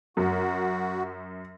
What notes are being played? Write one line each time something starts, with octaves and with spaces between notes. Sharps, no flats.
F#2 F#4